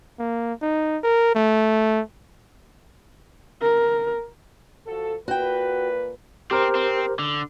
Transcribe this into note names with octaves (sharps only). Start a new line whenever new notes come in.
A#3
D#4
A#4
A3
A#4
F3 F#4 A4
A#2 F#4 B4 G5
C4 G4 A#4 C5
C4
D3